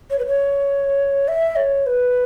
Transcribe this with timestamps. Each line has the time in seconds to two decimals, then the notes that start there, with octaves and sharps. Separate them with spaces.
0.10 C#5
0.19 B4
0.26 C#5
1.28 E5
1.56 C#5
1.86 B4